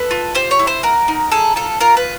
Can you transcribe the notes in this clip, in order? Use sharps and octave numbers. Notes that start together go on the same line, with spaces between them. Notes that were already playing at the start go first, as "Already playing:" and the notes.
Already playing: A4 B4
F4
G4 C5
C#5
E4
C5
F#4 A#4
D#4
G#4 A4
F4 A4
F4 A#4
B4